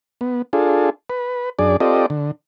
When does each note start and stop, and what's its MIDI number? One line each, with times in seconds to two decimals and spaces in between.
0.21 0.42 59
0.53 0.90 62
0.53 0.90 65
0.53 0.90 68
0.53 0.90 69
1.10 1.50 71
1.59 1.77 42
1.59 1.77 62
1.59 1.77 68
1.59 1.77 74
1.80 2.06 60
1.80 2.06 65
1.80 2.06 67
1.80 2.06 69
1.80 2.06 74
1.80 2.06 75
2.10 2.31 50